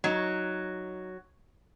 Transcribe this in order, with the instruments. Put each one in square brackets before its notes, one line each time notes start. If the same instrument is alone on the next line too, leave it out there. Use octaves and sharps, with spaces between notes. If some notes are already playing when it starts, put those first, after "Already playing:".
[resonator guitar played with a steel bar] F#3 [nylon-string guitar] D#4